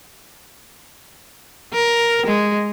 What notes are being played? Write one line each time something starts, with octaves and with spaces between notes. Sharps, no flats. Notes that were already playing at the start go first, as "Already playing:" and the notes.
A#4
G#3